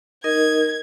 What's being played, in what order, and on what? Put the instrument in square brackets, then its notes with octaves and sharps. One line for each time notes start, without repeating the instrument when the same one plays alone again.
[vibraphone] D#4 A#4 D#5 [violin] G#6